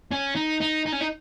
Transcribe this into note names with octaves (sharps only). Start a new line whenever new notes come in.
C#4
D#4
D#4
D#4
C#4
D#4